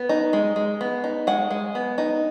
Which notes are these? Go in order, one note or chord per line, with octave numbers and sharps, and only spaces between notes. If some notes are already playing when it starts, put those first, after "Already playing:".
Already playing: B3
D#4
G#3
G#3
B3
D#4
G#3 F#5
G#3
B3
D#4